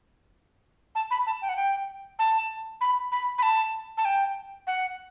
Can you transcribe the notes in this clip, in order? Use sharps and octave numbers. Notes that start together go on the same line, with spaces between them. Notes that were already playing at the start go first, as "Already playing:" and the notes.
A5
B5
A5
G5
F#5
G5
A5
B5
B5
B5
A5
A5
G5
F#5